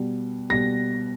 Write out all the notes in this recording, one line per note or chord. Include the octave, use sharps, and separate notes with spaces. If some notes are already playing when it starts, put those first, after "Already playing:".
Already playing: B2 G3
B2 G3 A#6